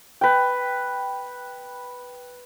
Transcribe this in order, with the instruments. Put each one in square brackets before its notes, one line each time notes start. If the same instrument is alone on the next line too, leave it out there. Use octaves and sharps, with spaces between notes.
[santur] B4 G5